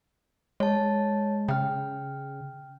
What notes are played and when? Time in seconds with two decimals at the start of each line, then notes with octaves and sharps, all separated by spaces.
0.60 G#3 C#5 A5
1.48 C#3 G5 F6